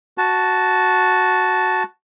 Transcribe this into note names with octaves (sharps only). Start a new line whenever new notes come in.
F#4 A5